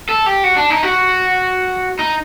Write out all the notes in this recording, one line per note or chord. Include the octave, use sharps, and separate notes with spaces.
A4
G4
F#4
D4
D#4
F#4
D#4